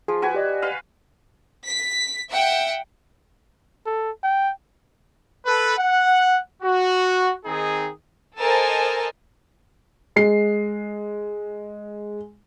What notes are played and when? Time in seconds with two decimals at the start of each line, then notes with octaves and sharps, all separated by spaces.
0.08 F3 G#4
0.22 F#4 B4 G#5
0.35 G4 D5 D#5
0.62 B4 F5
1.66 B6
2.29 E5 F#5 G5
3.86 A4
4.23 G5
5.45 A4 B4
5.77 F#5
6.62 F#4
7.45 D#3 C4 D#4 G#4
8.38 A4 A#4 C5 D#5 G#5 A5
10.16 G#3 C7